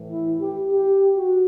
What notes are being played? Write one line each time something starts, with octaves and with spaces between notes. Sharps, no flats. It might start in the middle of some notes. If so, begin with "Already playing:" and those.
Already playing: A2 E3
E4
G4
G4
F#4